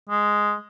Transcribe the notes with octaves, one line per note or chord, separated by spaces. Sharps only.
G#3